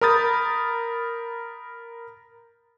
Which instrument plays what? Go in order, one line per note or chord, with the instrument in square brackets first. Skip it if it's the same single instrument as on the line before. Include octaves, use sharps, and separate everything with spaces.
[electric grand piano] A#4 A#5 B5 D#6 G6 A6